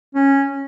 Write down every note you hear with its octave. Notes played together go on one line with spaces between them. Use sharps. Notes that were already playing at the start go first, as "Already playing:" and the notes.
C#4